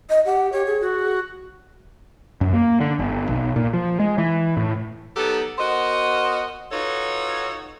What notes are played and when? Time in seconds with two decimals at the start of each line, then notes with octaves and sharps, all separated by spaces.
0.10 D#5
0.26 G4 F#5
0.53 G4 C#5
0.66 G#4
0.81 F#4
2.41 F#2
2.54 A#3
2.80 D3
2.99 G1
3.29 B1
3.56 A#2
3.74 F3
4.00 G#3
4.18 E3
4.57 A2
5.16 F#3 B3 D#4 G4 A4
5.59 B3 F#4 A#4 C5 D#5
6.72 D#4 F4 F#4 A4 B4 C#5